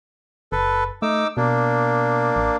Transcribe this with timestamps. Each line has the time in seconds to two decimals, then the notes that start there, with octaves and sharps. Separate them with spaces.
0.52 F#1 A4 B4
1.02 A3 D#4 D6 E6
1.37 B2 A#3 D4
2.36 A1